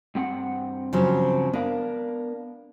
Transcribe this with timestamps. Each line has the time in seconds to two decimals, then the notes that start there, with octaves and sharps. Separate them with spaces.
0.15 G2 C4 F#5
0.93 C#3 F3 F#3
1.53 B3 D4 A#4 F5